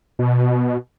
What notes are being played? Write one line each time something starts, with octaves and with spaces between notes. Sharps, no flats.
B2